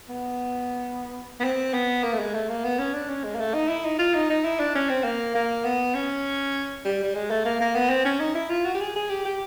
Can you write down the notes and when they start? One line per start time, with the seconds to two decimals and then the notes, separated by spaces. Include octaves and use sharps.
0.09 B3
1.40 B3
1.44 C4
1.74 B3
2.03 A#3
2.13 A3
2.19 G#3
2.34 A3
2.49 A#3
2.64 B3
2.79 C#4
2.94 D4
3.09 C#4
3.24 G#3
3.35 A#3
3.39 A3
3.54 D#4
3.69 E4
3.85 D#4
3.99 F4
4.14 D#4
4.30 D#4
4.45 E4
4.59 D4
4.75 C#4
4.89 C4
5.04 A#3
5.35 A#3
5.65 B3
5.94 C#4
6.85 G3
7.03 G3
7.15 G#3
7.30 A3
7.45 A#3
7.60 A#3
7.75 B3
7.90 C4
8.05 C#4
8.20 D#4
8.34 E4
8.49 F4
8.65 F#4
8.74 G4
8.80 G#4
8.95 G#4
9.10 G4
9.25 G4